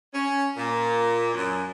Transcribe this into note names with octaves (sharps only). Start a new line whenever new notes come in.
C#4
A#2
F#2